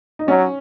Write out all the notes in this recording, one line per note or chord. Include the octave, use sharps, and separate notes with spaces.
D#4
F#3 C#4